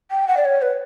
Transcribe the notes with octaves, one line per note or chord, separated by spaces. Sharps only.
G5
F#5
D5
C#5
B4